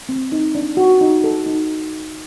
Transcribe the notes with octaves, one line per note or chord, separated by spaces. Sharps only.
C4
D#4
D4
F#4
D#4
A4
D#4